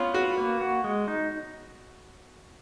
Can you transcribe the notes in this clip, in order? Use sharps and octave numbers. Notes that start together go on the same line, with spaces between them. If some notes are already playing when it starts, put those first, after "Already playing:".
Already playing: B3 C#4 F4
F#4 B4
A#3
F#4
G#3
D#4